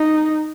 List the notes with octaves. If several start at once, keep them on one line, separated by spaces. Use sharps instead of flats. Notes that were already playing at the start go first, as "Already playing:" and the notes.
Already playing: D#4